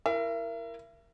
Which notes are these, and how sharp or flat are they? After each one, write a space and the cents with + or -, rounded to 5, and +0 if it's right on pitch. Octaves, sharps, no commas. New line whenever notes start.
E4 +10 A#4 +0 E5 +35